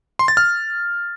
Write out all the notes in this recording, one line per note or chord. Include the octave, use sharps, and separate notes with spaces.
C6
A6
F6